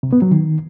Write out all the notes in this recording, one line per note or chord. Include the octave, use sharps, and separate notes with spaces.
C3
B3
F#3
D#3